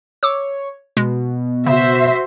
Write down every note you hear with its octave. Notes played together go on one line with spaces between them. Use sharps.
C#5 D6 E6
B2 G#3
C#3 F#4 C5 E5